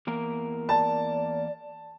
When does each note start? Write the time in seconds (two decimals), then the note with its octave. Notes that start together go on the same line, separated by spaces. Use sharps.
0.07 E2 A#3 A#4
0.69 D5 A5